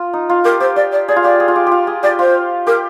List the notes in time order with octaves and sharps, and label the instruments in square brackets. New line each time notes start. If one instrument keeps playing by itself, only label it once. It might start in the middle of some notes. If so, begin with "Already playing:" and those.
Already playing: [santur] F4
D#4
F4
[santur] G4 [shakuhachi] A#4
[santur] G4 [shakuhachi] C5
[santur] G4 [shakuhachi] D5
[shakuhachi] D5
[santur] G#4 [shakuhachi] D5
[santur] F4
[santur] G4 [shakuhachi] D5
[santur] G#4
F4
G4
F4 G4
G#4
[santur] G4 [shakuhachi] D5
[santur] F4 [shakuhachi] C5
[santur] G4 [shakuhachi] A#4